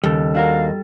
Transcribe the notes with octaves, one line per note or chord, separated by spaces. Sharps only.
D#2 C#3 G3 A4
D4 F#4 A#4 F5